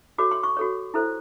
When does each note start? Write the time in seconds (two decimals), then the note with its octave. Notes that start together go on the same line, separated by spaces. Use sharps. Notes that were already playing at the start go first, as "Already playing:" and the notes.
0.18 F#4 A4 C#5 D6
0.31 C6
0.43 C#6
0.57 F#4 A4 C#5
0.94 E4 A4 C5